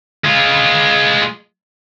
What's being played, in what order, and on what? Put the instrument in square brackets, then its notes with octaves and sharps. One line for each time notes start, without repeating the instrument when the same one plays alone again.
[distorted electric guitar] G#3 F4